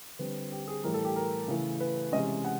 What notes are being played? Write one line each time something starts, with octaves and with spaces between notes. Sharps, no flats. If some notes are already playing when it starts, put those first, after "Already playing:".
D3 G3 C4 B4
G4
G#4
A2 E3 G3 A#4
A4
G4
A#4
C#3 E3 A3
B4
C3 E3 G#3 C#4 D#5
F#5